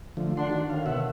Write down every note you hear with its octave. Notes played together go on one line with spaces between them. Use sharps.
D3 F3 A3
D4 F#5 C6
D#3 F#4
A2 D3 D#3 F5
B2 E5 F#5